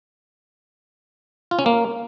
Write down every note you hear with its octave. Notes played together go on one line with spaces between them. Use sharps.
F4
C#4
A#3